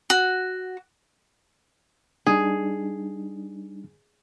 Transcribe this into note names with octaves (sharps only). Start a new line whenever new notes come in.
F#4
G3 D4 D#4 G#4